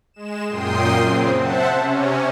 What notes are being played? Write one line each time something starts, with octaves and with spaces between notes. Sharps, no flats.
G#3 E7
F#2 A#2 G5 C6 D#6 C7
C#3 C4
C5 E5 F#5 A5
C3 C#4